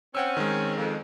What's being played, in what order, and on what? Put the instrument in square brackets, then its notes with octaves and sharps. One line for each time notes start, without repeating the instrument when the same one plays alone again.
[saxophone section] C4 C#4 [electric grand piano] F#5 G5 E6
[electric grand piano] D#3 G#3
[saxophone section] F2